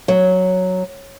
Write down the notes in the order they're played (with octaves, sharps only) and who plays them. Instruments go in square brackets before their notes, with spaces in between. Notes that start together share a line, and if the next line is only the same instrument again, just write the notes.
[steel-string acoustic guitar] F#3